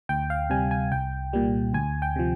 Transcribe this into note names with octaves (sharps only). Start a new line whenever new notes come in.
D2 G5
F5
C3 G3 G#5
G#5
C2 G5
A#2 G3
D2 G#5
G5
C3 F3